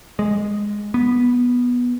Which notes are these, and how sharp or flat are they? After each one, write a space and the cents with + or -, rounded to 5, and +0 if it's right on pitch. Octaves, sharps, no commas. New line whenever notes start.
G#3 -5
B3 -10